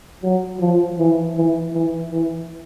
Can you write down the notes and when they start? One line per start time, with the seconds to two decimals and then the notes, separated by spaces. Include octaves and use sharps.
0.23 F#3
0.60 F3
0.98 E3
1.36 E3
1.74 E3
2.11 E3